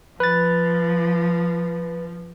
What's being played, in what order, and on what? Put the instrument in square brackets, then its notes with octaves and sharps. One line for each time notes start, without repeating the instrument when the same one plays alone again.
[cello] F3 [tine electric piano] B4 A6